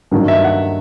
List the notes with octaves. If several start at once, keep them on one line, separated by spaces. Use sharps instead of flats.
G2 D#3 F#3 A#3
E5
F#5